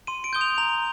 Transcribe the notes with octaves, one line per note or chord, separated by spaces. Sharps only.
C6 D#7
D7
D#6 G6 G7
F7
A#5 F7